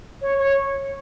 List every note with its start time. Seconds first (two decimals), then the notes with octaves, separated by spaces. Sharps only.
0.22 C#5
0.38 C#5